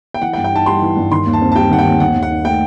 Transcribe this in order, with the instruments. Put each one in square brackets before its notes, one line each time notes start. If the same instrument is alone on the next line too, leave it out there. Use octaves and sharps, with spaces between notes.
[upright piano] G5
[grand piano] E3 [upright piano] F#5
[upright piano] G5
[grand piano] G2
[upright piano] G5
[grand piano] D#4 [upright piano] A5
[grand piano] G3 [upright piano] C6
[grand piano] E3
G2
[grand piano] D#3 [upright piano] C6
[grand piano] D#2
[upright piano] A5
[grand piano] C4
[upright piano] A5
[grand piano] G3 [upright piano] G5
[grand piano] D#3 [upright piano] F#5
[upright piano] G5
[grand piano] D#2
[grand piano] D#3 [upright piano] F#5
[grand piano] D#2
[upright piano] F#5
[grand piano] D#4
[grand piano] A3 [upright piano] G5